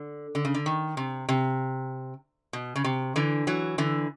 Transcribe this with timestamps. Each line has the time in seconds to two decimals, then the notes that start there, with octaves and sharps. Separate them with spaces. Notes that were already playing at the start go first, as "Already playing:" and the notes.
Already playing: D3
0.35 D3
0.45 C#3
0.54 D3
0.66 D#3
0.97 C3
1.29 C3
2.53 B2
2.76 C#3
2.84 C3
3.16 D3 E3
3.47 E3 F#3
3.78 D3 E3